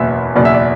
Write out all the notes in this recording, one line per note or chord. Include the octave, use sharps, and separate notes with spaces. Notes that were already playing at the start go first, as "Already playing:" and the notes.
Already playing: F#1 E2 B2 E5
F#1 E2 B2 D5
E5
D5